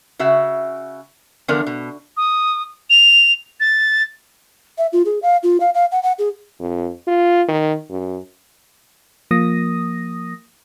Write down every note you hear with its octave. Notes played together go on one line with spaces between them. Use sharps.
C#3 F#4 E5
E2 D3 F3 B3 A#4 D5
B2
D#6
F7
A6
E5
F4
G#4
F5
F4
F5
F5
F#5
F#5
G#4
F2
F4
D#3
F#2
F3 A#3 D#6 A#6